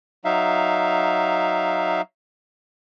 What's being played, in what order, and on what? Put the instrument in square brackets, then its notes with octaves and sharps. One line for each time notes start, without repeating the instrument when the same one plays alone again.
[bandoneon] F#3 D#4 E5 F5